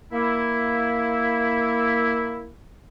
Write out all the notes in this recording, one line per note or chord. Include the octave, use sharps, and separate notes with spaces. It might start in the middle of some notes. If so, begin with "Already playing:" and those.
A#3 E4